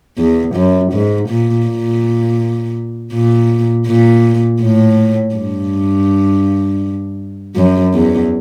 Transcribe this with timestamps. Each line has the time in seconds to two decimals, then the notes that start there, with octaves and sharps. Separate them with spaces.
0.18 E2
0.55 F#2
0.92 G#2
1.29 A#2
1.67 A#2
3.13 A#2
3.87 A#2
4.61 A2
5.35 G2
7.56 F#2
7.94 E2